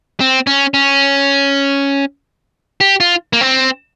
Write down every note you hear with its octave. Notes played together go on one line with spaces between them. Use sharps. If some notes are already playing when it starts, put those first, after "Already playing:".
C4
C#4
C#4
G4
F4
A#3
C4